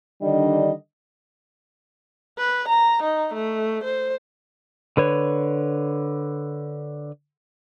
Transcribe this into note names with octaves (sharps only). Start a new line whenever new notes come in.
D3 D#3 G3 D4 D#5
B4
A#5
D#4
A3
C5
D3 B4 C#5